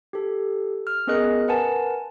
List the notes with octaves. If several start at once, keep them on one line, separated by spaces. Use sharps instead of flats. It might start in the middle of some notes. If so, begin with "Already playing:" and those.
G4 A4
F6
B3 C#4 G#4 A#4 D#5 F#6
A#4 B4 F#5 G#5 A5